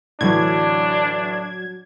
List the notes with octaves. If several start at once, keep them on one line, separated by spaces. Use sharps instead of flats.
A2 D3 E3 F#3 D4 G#6